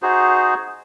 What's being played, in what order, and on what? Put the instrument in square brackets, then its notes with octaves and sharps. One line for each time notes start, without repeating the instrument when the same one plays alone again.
[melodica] D#4 F#4 G#4 C5